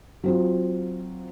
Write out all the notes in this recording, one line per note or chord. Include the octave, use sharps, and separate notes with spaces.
F#3 C4 F4